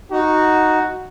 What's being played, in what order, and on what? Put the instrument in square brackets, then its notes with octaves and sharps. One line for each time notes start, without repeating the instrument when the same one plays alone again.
[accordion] D#4 [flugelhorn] F#4